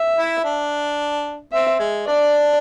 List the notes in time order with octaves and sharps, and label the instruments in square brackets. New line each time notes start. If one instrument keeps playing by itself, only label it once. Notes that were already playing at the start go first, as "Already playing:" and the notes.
Already playing: [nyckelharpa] E5
[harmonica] E4
D4
[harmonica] C4 [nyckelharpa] E5
[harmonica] G#3
[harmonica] D4 [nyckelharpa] D5